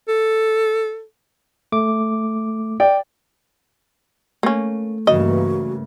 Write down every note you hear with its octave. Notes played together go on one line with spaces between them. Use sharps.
A4
A3 D6
D5 G5
A3 A#3 C#4
G2 C#3 E3 A#3 F#4 D#5